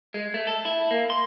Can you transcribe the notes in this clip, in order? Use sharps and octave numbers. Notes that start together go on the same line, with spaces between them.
G#3
A3
A4
E4
A#3
C6